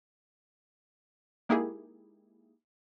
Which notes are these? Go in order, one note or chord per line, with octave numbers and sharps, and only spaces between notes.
G#3 A#3 D#4 E4 G4 G#4